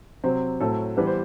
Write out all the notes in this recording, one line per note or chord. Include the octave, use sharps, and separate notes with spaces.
C3 F#3 C4
A2 F#3 C4 A4
E3 G3 B3 B4
C5